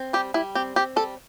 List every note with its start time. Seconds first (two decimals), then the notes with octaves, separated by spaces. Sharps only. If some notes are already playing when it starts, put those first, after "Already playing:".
Already playing: C4
0.13 G3 G4
0.34 G3 E4
0.55 C4 G4
0.76 C4 G4
0.96 G3 A4